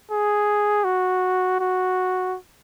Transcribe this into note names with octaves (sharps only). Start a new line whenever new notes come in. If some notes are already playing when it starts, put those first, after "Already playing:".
G#4
F#4
F#4